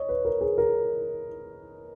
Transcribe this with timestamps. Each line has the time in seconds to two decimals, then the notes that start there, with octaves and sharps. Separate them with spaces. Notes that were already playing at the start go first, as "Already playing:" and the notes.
Already playing: C#5 D#5
0.09 B4
0.25 A#4
0.41 G#4
0.58 A#4